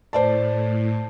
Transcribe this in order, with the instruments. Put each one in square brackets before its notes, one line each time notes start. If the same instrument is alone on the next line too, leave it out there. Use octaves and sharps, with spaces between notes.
[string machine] A2 [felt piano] C5 D5 A5